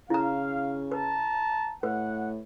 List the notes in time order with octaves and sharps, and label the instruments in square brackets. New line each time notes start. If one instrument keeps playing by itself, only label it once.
[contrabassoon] C#3 [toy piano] E4 A#5 [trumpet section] F5
[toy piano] B4 [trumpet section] A5 A#5
[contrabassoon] A2 [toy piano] B4 [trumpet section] F#5